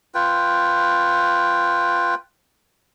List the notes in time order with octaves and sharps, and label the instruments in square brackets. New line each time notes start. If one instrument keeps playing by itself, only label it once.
[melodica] F4 B4 G5